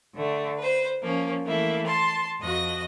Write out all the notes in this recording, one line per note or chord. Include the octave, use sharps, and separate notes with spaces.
D3 A3
B4 C5
F3 A#3 C#4
E3 A3 A#3 E4
A5 C6
F2 F#4 D#5 A#6